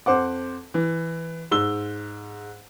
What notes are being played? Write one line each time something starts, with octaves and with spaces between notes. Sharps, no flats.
F2 C5 F#5 D6
E3
G#2 E6 G7